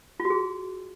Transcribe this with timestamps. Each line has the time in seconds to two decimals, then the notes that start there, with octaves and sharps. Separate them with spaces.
0.20 F4
0.25 F#4
0.30 G#4